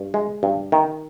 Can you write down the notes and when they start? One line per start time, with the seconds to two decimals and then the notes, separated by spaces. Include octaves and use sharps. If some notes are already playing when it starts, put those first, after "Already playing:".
Already playing: G2
0.14 G#3
0.43 G2
0.72 D#3